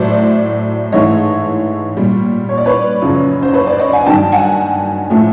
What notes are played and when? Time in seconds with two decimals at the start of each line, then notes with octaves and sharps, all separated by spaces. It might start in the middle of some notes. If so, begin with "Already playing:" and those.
Already playing: A2 F#3 A3 C5 D5
0.92 G#2 E3 A3 C#5 D#5
1.97 A#2 G3
2.49 C#5
2.57 D5
2.65 B4 C#5
3.01 F#2 C#3 F3
3.42 C5
3.53 B4 C#5
3.67 C5 D5
3.79 C#5 D#5
3.93 F#5 G#5
4.06 G2 D#3 F#3 G5 A5
4.32 F#5 G#5
5.10 A2 F3 A3